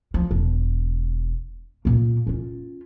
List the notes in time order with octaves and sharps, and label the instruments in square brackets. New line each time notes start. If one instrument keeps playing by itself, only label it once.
[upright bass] F3
E1
A#2 A#3
C#4 F4